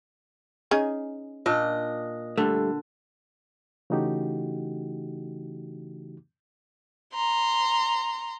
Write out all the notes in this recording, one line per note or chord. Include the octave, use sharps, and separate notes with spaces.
C#4 D#4 G#4
A#2 D4 D#5
D3 G3 A3
C#3 E3 A3 D#4 F#4 G4
A#5 C6